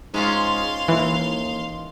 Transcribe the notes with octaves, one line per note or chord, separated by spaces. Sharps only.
G#2 G#3 C#4 F4 F5 C6
D#2 E3